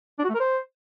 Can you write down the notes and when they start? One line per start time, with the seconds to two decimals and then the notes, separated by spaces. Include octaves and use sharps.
0.19 D4
0.24 F#4
0.29 A3
0.34 A#4
0.40 C5